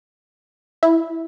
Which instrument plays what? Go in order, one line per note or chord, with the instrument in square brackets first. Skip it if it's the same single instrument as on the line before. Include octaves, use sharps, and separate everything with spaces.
[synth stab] E4